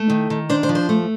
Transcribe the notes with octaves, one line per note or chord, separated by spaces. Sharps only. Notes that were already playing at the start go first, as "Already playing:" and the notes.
Already playing: A3
D#3
D#3
D4 C5
C5
F3
C5
A3